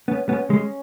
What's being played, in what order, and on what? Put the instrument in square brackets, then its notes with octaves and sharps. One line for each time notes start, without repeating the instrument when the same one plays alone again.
[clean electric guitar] B3 [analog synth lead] C#4
[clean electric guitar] B3 [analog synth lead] C#4
[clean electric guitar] G#3